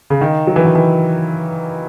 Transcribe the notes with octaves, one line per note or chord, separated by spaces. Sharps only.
C#3
D#3
F#3
E3
D#3
E3